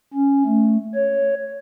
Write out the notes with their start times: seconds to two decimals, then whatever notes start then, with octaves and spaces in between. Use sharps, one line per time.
0.14 C#4
0.45 A3
0.95 C#5